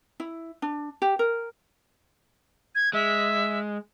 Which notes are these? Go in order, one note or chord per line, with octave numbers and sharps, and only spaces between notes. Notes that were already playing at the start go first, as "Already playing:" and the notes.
E4
D4
G4
A#4
G#6
G#3 E5